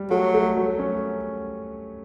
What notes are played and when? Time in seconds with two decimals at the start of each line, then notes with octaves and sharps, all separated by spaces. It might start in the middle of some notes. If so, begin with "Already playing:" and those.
Already playing: G3
0.10 F#3 A3
0.34 A3
0.57 F#3
0.79 C#4